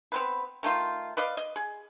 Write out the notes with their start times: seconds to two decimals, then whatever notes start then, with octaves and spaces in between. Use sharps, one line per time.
0.12 B3 C4 B4
0.63 D#3 A3 D#4 F4
1.17 B4 D5 D#5 F5
1.37 D#5
1.56 G#4